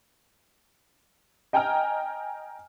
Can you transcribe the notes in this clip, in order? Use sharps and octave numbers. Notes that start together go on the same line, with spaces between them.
D#5 G5 G#5 A#5 F6